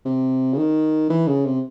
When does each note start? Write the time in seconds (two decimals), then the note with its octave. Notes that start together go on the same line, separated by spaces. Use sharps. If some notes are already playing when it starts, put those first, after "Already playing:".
0.05 C3
0.54 C#3
0.58 D#3
1.10 E3
1.28 C#3
1.46 C3